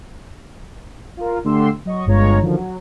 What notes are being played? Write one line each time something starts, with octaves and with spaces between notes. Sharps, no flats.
F4 A#4
D3 A3 G4 C6 E6
F#3 D#5 C#6
G1 G2 G#3 F4 C#5 A#5
D3 D#3 F3 F#3
F#3